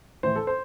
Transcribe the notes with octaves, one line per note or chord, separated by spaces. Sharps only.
A2 E3 C5
A4
C5